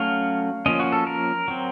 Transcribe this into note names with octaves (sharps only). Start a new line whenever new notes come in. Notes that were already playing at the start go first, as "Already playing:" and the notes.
Already playing: F#3 A3 C#4 F5
F3 A#3 C#4 D#5
F#4
A4
A#4
F#3 C4